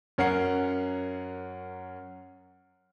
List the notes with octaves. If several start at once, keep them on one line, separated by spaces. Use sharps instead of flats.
F#2 C#4 A#4 C#5 F#5 C7